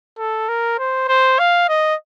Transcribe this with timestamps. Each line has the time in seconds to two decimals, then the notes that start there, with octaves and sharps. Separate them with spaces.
0.19 A4
0.49 A#4
0.79 C5
1.09 C5
1.39 F5
1.69 D#5